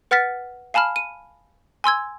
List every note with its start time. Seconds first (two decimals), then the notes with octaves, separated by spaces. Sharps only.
0.11 B4 F#5 F6 A6 B6
0.74 F5 G#5 A5 B5 F6
0.96 D#7
1.84 G#5 C6 E6 G#6